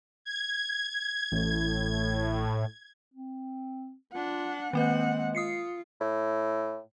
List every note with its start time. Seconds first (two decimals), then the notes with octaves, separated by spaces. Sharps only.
0.25 G#6
1.32 A1 A2
3.14 C4
4.13 D4 F4 F#5
4.73 D#3 G#3 A#3 C4 B4 F#5
5.35 F4 D#6 C7 C#7
6.00 A2